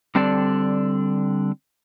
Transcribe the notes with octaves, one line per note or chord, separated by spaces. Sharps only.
D3 G3 C4 D4 A4 D5